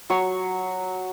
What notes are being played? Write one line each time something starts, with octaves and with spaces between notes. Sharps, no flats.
F#3 C#6